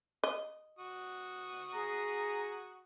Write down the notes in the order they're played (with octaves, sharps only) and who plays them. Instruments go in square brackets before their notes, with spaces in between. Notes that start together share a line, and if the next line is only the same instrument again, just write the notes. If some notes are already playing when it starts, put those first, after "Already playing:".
[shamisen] D#5
[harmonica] F#4 D#6
[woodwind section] G#4 [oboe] A#5